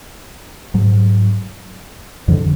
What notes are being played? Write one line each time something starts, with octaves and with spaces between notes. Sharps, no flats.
G#2 F#3
F2 D3 F3